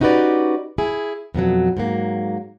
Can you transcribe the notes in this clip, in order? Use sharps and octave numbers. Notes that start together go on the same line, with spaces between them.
C#4 D#4 F#4 G4 B4 D5
E4 G#4
F2 B2 F3 F#3
G#2 F#3 A#3